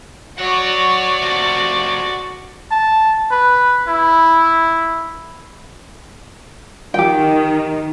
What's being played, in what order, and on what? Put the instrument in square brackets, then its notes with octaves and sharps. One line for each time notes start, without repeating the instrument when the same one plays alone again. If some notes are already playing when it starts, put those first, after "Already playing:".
[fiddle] F#4 D5 [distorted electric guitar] C#5 F#5
[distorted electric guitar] C3 A3
[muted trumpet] A5
B4
E4
[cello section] D#3 [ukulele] G4 G5